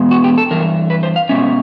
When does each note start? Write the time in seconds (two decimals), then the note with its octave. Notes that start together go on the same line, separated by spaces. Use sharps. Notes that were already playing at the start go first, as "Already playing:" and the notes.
Already playing: E2 B2 G#3 B3
0.11 F#4
0.24 G4
0.38 A4
0.51 G2 E3 A#4
0.90 B4
1.03 C5
1.16 F5
1.29 B2 G#3 C#4 E5